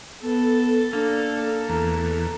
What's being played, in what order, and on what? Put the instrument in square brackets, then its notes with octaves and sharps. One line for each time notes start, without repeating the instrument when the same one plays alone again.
[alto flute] B3 [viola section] A4
[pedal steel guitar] A#3 [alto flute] D4
[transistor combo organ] E2 [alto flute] A#5